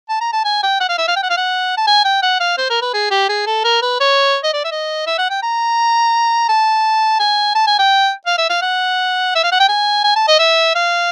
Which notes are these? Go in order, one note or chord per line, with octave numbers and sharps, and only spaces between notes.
A5
A#5
A5
G#5
G5
F#5
F5
E5
F5
G5
F#5
F5
F#5
A5
G#5
G5
F#5
F5
C5
A#4
B4
G#4
G4
G#4
A4
A#4
B4
C#5
D#5
D5
E5
D#5
E5
F#5
G5
A#5
A5
G#5
A5
G#5
G5
F5
E5
F5
F#5
E5
F5
F#5
G5
G#5
G#5
A5
D#5
E5
F5